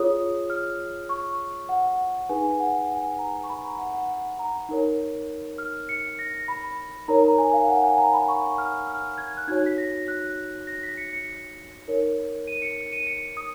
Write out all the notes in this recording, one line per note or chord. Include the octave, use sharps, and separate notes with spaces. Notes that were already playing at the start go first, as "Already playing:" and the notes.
Already playing: F4 G#4 C#5 D#6
F6
C#6
F#5
D#4 G#4 B4 G#5
F#5
G#5
A#5
C#6
B5
A#5
F#5
F#5
A#5
D#4 A#4 C#5
F6
C#7
A#6
B5
D#4 A#4 C#5 A#5
A#5
G#5
F5
F#5
G#5
A#5
B5
C#6
F6
F6
G#6
F#6
D#4 F#4 C#5 G#6
B6
A#6
F#6
A#6
B6
C#7
C#7
D#4 A#4 C#5
D#7
C#7
C#7
D#7
C#7
D#6